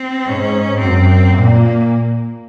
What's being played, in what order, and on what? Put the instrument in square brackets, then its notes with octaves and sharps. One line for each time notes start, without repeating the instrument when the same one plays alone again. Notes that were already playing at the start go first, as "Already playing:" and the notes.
Already playing: [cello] C4
[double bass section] G#2 [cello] C#4
[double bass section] F#2 [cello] C4
[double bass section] A#2 [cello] A#3